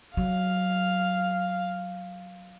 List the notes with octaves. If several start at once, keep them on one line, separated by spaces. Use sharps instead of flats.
F#3 F5